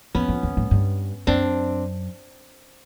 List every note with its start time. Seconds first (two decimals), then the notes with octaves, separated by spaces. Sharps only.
0.15 F2 B3 C#4
0.28 F2
0.43 E2
0.57 G#2
0.71 G2
1.27 F#2 C4 D4